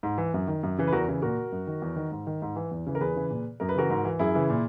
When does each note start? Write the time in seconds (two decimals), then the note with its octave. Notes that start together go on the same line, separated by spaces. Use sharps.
0.03 G#2
0.18 E3
0.34 F#2
0.48 D#3
0.63 F#2
0.78 C#3 E3
0.87 B4
0.92 E2 F#4 A#4
1.08 C#3 E3
1.22 A#2 F#4 A#4
1.52 F#2
1.67 D#3
1.82 E2
1.96 D#3
2.12 G#2
2.27 D#3
2.42 G#2
2.56 E3
2.71 E2
2.87 C#3 E3
2.95 A#4
3.01 E2 G#4 B4
3.16 C#3 E3
3.30 A#2
3.60 F#2 A#4
3.69 B4
3.75 C#3 E3 F#4 A#4
3.90 G#2
4.05 E3
4.19 F#2 E4 G#4
4.35 C#3 E3
4.50 A#2